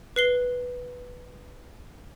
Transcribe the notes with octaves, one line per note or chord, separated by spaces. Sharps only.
B4 C7 G7